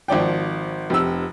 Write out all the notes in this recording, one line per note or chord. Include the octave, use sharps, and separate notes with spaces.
G#1 F3 D5 G5
F1 C3 E6